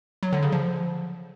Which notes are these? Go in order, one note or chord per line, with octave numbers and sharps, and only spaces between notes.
F#3
D3
C#3
F3